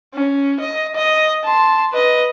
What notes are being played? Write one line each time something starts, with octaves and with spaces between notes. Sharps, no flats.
C#4
D#5
D#5
A5 C6
B4 D#5